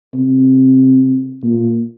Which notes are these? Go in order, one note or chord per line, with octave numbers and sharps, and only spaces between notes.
C3
A#2